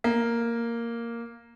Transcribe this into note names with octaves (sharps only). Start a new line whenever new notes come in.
A#3